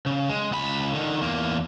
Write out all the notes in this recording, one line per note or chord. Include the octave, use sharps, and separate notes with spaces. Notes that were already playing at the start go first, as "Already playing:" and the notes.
C#3
G#3
C#2 B5
D3 D#3
E2 A#3